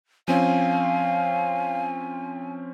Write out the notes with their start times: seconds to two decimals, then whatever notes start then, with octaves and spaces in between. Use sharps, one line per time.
0.28 F3 C4 C#4 F5 G#5